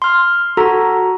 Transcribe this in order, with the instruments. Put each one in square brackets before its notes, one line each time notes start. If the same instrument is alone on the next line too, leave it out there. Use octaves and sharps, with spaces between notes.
[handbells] C6 F6
F#4 A4 A#5